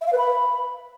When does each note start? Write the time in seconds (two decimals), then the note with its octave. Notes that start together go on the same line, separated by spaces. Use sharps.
0.01 E5
0.07 F5
0.12 B4
0.18 B5